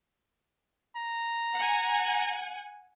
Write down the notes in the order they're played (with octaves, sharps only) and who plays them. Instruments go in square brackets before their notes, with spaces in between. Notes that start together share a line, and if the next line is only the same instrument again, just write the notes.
[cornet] A#5
[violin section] F#5 G#5